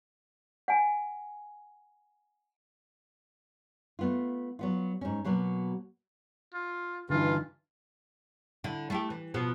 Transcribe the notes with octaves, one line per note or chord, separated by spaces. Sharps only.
F#5 G#5
A3 B3 F4
F#3 B3 F4
G#2 C#4
B2 F#3 A#3 B3
F4
G2 D3 E3 D#4 F4
D3 E4
A3 E4 G4
E3
B2 F3 B3